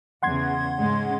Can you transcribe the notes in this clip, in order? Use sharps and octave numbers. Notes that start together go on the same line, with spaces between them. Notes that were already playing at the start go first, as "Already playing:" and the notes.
E2 C#3 F#5 C6 G#6
G#2 C#3 G#3